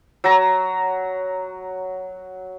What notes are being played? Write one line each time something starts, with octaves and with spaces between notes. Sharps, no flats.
F#3 A#5